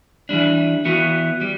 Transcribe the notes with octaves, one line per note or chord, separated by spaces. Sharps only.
E3 G3 D4
E3 B3 F#4
G3